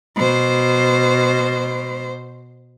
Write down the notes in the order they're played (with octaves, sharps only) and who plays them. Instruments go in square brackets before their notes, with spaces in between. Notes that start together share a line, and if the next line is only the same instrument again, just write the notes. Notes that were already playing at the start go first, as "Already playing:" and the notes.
[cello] B2 C5